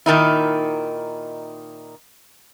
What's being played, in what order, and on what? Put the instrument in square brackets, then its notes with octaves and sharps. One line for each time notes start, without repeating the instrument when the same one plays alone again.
[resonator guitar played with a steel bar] A#2 D#3 D#4 E4